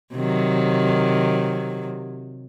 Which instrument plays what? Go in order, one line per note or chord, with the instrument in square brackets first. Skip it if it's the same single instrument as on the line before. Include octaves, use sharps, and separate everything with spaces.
[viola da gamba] C3 D#3 F#3